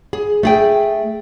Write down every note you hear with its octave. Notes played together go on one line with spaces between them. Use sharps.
G#4
A3 G#4 G5